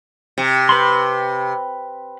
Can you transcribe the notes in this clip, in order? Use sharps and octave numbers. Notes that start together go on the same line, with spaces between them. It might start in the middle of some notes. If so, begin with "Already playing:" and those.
C3
B4 B5 C6